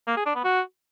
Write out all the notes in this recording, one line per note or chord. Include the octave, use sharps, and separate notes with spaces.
A#3
G#4
D4
B3
F#4